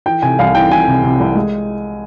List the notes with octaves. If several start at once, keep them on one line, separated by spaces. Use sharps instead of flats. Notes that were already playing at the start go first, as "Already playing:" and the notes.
E3 G5
C3 G#5
C2 F5
E3 G5
E3 G#5
C3
C3
C2
G#3